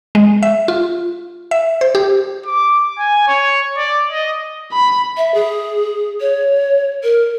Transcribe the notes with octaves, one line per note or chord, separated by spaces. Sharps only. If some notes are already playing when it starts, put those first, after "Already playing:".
G#3
E5
F4
E5
C5
G4
D6
G#5
C#5
D5
D#5
B5
E5
G#4
C#5
A#4